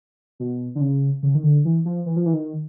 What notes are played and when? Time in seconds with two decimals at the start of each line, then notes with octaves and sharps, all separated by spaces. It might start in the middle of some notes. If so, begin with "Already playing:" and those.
0.40 B2
0.75 D3
0.81 C#3
1.23 C#3
1.35 D#3
1.43 D3
1.65 E3
1.85 F3
2.06 E3
2.16 F3
2.26 E3
2.34 D#3